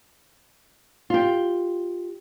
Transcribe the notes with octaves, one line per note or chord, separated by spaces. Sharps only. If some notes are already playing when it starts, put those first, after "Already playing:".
F4 G4